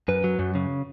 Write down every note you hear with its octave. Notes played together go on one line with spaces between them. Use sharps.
F#2 B4
F#3
F#2
C#3